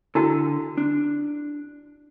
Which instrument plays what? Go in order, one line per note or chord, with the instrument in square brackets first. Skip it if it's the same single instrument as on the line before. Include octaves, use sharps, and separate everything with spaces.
[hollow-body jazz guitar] D3 A4 G#5 [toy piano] E4 F#4
[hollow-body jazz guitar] D4